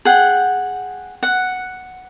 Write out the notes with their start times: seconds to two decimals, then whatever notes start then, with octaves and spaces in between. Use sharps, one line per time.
0.05 G#4 F#5 G5
1.23 F#5